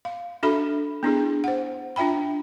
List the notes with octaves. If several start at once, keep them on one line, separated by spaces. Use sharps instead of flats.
F5
D4 F#4 A4 E5 B5
B3 D4 E4 G#4
C5 F#5
D4 F4 E5 G5 B5